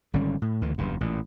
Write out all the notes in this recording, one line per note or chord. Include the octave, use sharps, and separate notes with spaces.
G#1 D3 G3 C#4
A2
D2 D3 E3
F#1 E2 G2
A1 A#2